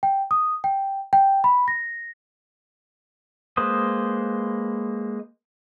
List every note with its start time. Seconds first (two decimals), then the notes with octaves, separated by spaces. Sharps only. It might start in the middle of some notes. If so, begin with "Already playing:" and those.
0.03 G5
0.31 D#6
0.64 G5
1.13 G5
1.44 B5
1.68 A#6
3.57 G#3 A#3 B4 C5 D#6